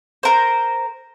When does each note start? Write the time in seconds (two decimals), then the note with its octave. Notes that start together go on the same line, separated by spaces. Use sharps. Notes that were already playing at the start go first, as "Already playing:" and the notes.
0.23 A#4 C5